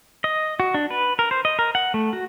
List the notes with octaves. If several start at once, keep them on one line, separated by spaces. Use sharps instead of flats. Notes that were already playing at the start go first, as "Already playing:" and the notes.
D#5
F#4
D4
B4
A#4
C5
D#5
A#4
F#5
A3
F#4